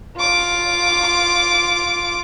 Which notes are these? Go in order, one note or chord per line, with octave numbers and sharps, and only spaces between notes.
F4 D6